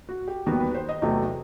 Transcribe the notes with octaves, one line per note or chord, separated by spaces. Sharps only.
F#4
G4
D#2 D#3 G3 B3 F#4
B4
C5
D#5
E2 C3 F#3 A3 D#5